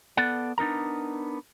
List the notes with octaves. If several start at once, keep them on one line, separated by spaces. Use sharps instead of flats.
B3 A4 D5 F#5
B3 D4 D#4 A#4 A#5